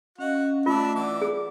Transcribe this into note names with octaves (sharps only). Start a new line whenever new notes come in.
C#4 F#4 D#5 F5 F#5
A3 D4 F4 E5 A5
E3 D5 F#5 D6
G#4